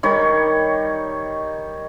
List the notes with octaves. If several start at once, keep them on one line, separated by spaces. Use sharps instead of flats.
D#3 G3 C#5